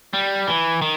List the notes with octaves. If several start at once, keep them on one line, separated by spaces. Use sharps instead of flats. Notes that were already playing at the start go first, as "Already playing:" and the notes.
G3
E3
D#3